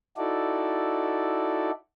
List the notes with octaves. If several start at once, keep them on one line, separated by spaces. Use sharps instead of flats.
D#4 E4 F#4 A4 D5